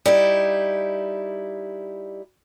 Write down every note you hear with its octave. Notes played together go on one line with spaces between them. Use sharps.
G3 D#4 E4